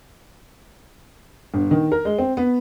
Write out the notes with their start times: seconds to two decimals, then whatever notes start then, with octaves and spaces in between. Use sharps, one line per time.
1.54 G1
1.71 D#3
1.92 A#4
2.05 G#3
2.19 C4
2.37 B3